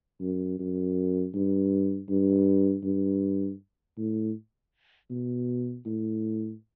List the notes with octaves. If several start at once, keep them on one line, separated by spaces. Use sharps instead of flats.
F#2
F#2
G2
G2
G2
A2
B2
A2